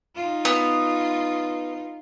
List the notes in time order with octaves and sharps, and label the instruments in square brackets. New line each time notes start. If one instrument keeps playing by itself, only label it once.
[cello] D#4 F4
[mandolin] B3